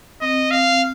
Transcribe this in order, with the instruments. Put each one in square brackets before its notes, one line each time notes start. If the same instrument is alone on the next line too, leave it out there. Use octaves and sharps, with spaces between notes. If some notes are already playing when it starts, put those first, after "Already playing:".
[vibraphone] C4 [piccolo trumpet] D#5
[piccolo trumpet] F5